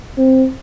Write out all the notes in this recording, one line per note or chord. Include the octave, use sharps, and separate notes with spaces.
C4